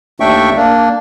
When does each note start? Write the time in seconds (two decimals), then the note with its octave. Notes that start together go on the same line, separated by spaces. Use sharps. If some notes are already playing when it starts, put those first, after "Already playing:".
0.20 D#2 A3 D4 E5 G5 C#6
0.56 A#3 D4